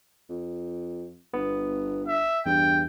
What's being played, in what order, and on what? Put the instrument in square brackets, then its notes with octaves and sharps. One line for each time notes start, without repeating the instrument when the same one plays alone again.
[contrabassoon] F2
[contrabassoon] G1 [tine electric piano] B3
[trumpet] E5
[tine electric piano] E2 [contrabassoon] G2 [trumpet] G5